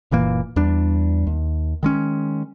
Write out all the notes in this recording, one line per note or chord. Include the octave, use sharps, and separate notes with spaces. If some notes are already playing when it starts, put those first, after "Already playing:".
F#1 A#2 E3 A#3
E2 G3 D4
D#2
D#3 G#3 C#4